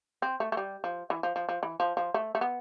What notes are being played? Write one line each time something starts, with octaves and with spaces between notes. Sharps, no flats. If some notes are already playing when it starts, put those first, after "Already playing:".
C4
A3
A3
G3
F3
E3
F3
F3
F3
E3
F3
F3
A3
A3
B3